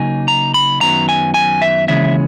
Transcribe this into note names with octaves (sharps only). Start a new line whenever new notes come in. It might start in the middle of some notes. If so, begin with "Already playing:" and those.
Already playing: C#3 F#3 A#3 D#4 G#5
A#5
B5
F#2 D#3 F#3 B3 A#5
G#5
G#5
E5
D#2 C#3 E3 G#3 C#4 E5